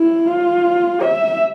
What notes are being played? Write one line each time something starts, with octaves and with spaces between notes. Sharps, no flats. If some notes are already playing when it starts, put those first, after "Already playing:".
Already playing: E4
F4
E5